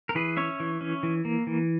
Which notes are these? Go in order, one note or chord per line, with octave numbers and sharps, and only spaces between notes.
A#4
E3 G#4 B4
C#4 C#5 E5
E3
C#4
E3
A#3
E3